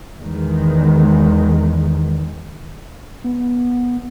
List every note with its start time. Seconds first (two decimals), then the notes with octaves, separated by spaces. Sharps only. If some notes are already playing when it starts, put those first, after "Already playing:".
0.19 E2 D#3 G#3
3.24 B3